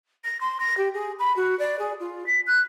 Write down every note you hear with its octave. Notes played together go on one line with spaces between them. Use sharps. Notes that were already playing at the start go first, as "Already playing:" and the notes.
A#6
C6
A#6
G4
G#4
B5
F#4
D5
G#4
F4
B6
F#6